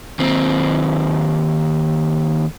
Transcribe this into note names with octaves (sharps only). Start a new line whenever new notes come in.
D#2 C4